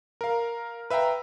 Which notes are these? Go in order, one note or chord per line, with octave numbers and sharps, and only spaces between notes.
A#4 F5
B4 E5 F5 G5 A#5